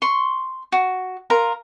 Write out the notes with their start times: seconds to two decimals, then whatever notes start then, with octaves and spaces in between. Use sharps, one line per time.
0.02 C6 C#6
0.72 F#4
1.30 F4 A#4 A#5